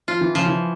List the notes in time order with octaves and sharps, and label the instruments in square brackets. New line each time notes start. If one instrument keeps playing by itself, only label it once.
[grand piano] F3 [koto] F4
[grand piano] E3
[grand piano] C#3 [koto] F3
[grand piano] E3